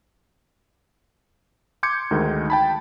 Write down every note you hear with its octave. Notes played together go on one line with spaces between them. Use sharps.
C6 D6 G6 G#6 C#7
D2 D#3 G#3
G5 A5 B5